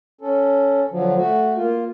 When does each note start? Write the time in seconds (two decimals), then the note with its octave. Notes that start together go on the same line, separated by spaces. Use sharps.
0.21 C#4 A4
0.90 D3 F3 F#3
1.17 A3 F#4
1.57 A#3 F4